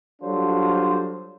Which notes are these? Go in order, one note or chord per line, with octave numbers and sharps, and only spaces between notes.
F#3 G3 D4 F4 A4 C5